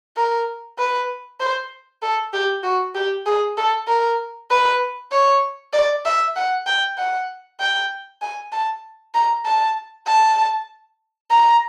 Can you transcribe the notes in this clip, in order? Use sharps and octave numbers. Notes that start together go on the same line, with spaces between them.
A#4
B4
C5
A4
G4
F#4
G4
G#4
A4
A#4
B4
C#5
D5
E5
F#5
G5
F#5
G5
G#5
A5
A#5
A5
A5
A#5